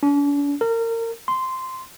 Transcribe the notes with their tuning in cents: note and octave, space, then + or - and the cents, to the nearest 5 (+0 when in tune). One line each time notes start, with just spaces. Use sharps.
D4 -45
A#4 -30
C6 -10